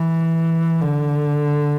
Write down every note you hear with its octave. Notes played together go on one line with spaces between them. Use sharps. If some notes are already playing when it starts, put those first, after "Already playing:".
Already playing: E3
D3